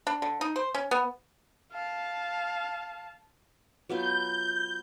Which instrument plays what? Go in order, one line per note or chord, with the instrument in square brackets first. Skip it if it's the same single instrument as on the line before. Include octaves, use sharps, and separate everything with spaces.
[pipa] D4
D3
D#4
C5
C#4
B3
[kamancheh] F5 A5
[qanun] F#3 B3 F4 [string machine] G6